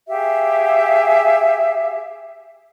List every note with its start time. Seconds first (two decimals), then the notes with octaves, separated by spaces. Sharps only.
0.09 G4 G#4 E5 F5